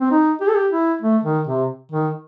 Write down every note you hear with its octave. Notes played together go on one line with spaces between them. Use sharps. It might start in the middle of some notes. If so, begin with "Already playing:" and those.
C4
D#4
G4
A4
G4
E4
A3
D#3
C3
D#3